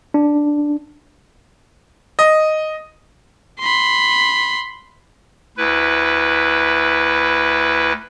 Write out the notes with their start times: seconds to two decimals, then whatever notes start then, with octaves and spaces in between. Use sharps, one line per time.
0.14 D4
2.19 D#5
3.60 B5 C6
5.57 D2 E4 B4